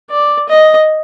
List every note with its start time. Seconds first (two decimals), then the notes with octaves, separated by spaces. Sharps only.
0.11 D5
0.49 D#5